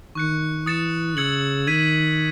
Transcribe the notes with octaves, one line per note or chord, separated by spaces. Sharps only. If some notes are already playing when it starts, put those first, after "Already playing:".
D#3 C#6 F#6 C#7
E3 D#6 A6 C#7 E7
C#3 E6 G#6 C#7 F#7
D#3 G#6 B6 D#7